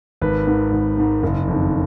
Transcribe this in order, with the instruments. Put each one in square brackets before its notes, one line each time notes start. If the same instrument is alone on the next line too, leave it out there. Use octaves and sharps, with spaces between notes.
[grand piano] G#1 B4
G#2 D#3
G#1
G#2 D#3
F#1
F2 D#3